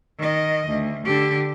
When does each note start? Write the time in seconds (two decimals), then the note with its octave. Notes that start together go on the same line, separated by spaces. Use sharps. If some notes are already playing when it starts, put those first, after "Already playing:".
0.19 D#3 D#5
0.68 D2
1.05 D3 G4